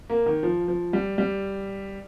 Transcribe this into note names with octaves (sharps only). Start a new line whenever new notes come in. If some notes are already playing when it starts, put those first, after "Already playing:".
A#3
D#3
F3
F3
G3
G3